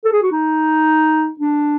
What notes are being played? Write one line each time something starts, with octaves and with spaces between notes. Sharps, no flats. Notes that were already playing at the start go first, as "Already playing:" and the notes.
A4
G#4
F#4
D#4
D4